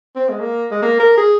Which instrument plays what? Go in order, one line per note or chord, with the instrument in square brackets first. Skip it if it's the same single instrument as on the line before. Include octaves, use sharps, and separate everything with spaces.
[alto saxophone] C4
G#3
A#3
G#3
A#3
A#4
G#4